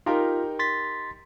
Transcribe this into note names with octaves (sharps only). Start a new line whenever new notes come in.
D#4 F4 G4 A#4
C6 A6 B6